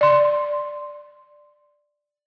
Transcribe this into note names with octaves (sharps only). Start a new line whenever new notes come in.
D5 C6